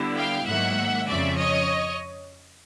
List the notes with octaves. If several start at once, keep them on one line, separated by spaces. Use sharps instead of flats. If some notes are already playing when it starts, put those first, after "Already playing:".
Already playing: D3 G3 B3 E4
F5 G5
G#2 D#3 F#3 A#3 E5 F#5
F2 C#3 F3 D5 E5
C#5 D#5